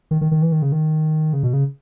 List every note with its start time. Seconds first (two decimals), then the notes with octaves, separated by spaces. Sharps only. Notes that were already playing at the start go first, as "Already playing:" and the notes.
0.11 D#3
0.21 D#3
0.31 D#3
0.42 E3
0.52 D#3
0.62 C#3
0.72 D#3
1.33 C#3
1.43 B2
1.53 C#3